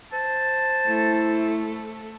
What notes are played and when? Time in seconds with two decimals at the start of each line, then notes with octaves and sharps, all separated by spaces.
0.13 C5 A5
0.86 A3 E4 A4